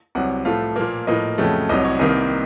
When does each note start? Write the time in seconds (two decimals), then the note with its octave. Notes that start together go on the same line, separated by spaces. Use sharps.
0.15 C2 C3 F#3 F#5
0.45 A2 F3 A3 F5
0.76 A#2 F3 A#3
1.07 A2 F3 A#3 D#5
1.38 F2 C#3 F#3 A3
1.69 C2 C3 F#3 D#5
1.84 C#5
1.99 C2 C3 D#3 A#3 D#5